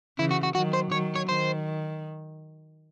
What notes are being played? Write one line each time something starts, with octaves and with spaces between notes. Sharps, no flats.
C#3 E3 E4
F#4
F#4
D#3 F#3 F#4
C5
D#3 F#3 C#5
C#5
D#3 C5